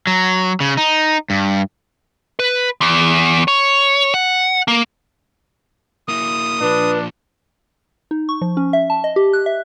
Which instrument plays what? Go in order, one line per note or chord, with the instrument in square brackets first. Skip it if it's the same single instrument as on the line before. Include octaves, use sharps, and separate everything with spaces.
[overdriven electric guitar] F#3
C#3
D#4
G2
[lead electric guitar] B4
E2
C#5
F#5
A#3
[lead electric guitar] A#3 E4 [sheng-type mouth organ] D#6
[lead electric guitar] A#2 F3 [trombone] D4 [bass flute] B4
[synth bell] D#4
C#6
F3
C#4
E5
A5
D#5
G4
F#6
E5